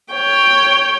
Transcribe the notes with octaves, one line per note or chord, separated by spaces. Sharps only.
C#5 G5